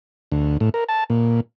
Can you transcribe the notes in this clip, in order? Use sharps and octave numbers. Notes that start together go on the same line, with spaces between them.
D2
A2
A#4
A5
A#2